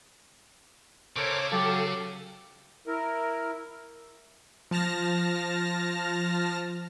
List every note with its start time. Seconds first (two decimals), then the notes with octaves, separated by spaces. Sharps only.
1.16 C#3 A4 A#4 C5 C#5 D6
1.52 F#3 G4 A4 F5 A5
2.87 E4 A#4
4.71 F3 A5 F6 A#6